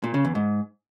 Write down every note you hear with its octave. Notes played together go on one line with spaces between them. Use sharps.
A#2
C#3
E2
G#2